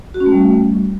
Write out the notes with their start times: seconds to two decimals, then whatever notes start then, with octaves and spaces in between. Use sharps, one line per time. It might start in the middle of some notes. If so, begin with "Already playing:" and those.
0.14 F#4
0.20 C#4
0.26 A3
0.32 G3